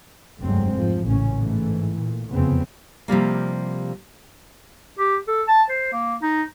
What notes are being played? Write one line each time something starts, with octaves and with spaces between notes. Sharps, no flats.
F1 D2 G2 F#3 G#3 C4
G#2 F3
A1 A#2 C#3 C#4
G#2 E3 A3
A#2
F1 E2 C#3 F3 B3 C4
C3 F3 G3 A#3
G4
A4
A5
C5
A#3
D#4